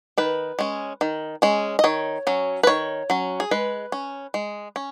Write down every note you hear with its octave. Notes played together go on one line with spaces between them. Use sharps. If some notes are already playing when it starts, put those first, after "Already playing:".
D#3 B4
G#3 C#4
D#3
G#3 C#4
D#5
D#3 C#5
F#3 C#4
B4
D#3 C#5
F#3 C#4
G#4
G#3 B4
C#4
G#3
C#4